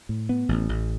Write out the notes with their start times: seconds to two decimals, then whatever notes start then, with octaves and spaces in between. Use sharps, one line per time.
0.09 A2
0.29 B3
0.49 A1
0.69 A1